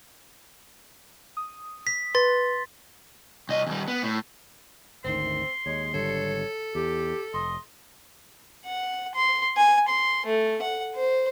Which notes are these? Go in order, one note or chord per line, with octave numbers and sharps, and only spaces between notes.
D#6
B6
B4 C6 A6
C2 D#5
D#2 G3
B3
A2
G#1 D2 D#3 C4 C6
D#2 G#3 C#5
G#1 D3 G3 A4 C#5
E2 G4
F1 D#5 C6
F#5
C6
G#5
C6
A3
F#5
C5